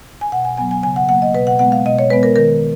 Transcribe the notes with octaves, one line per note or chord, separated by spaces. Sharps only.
G#5
B2 F#5
G#5
F#3 B3 G#5
G#5
C#3 G#5
F#5
F#3 A#3 F#5
D#5
B2 B4
F#5
G#3 B3 F#5
F5
B2 D#5
C#5
G#3 B3 B4
A#4
D#3 A#4